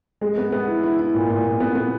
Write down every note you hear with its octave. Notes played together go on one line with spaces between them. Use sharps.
G#3
B3
B3
E4
E4
E4
A#2
A#2
A#2
B3
B3